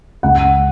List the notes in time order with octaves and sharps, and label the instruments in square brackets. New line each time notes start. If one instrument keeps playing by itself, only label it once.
[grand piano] C#2 F#5